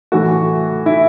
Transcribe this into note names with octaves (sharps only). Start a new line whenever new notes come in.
A2 E3 A3 F#4
E4